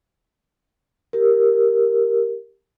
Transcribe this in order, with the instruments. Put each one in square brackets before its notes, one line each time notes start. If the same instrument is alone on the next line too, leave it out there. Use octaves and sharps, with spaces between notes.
[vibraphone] G4 A#4